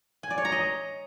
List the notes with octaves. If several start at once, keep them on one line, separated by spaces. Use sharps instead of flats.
G#5
D5
C#5
A#5
D#5